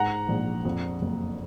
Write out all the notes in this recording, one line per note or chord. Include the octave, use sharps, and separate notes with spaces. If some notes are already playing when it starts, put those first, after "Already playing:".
Already playing: G#2 F#5 A#5
A#1
F2
F#1